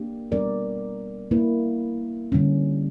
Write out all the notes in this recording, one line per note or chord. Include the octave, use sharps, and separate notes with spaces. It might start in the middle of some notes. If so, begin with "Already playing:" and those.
Already playing: A#3 D4 G4
G3 B3 D4 A#4 D5
A#3 E4 B4
D3 G3 C#4